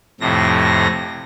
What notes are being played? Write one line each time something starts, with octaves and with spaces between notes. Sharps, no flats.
F2 A2 C3 A#6